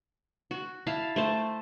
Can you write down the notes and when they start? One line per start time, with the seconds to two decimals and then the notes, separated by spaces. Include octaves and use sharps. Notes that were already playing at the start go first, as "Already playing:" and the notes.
0.51 F#4
0.87 E4 F5 A5
1.16 A3 C5 A5